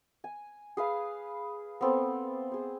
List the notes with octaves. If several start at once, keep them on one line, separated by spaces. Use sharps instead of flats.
G#5
G#4 B4 F5
B3 C4 A4
G#4 C5